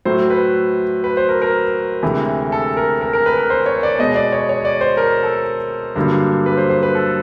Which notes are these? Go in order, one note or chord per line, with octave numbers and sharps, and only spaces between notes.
A2 F#3 A3 C5
B4
B4
C5
A#4
A#4
D2 C3 E3 G#3
A4
A#4
A#4
A#4
B4
A#4
C5
C#5
D5
B2 G#3 B3 D#5
D5
C#5
C#5
D5
C5
A#4
A4
G2 D3 F#3 A#3
B4
C5
C5
B4
A4